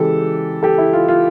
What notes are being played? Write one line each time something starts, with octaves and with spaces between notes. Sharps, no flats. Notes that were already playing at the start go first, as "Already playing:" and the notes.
Already playing: C#3 E3 G#3 G4 A4
G4 A4
E4
F4
F4